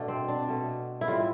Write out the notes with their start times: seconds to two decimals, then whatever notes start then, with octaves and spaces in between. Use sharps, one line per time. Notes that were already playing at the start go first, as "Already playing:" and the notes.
Already playing: B2 A3 D4
0.08 C4
0.28 D4
0.48 B2 A3
1.01 E4
1.07 A2 E3 G3 F4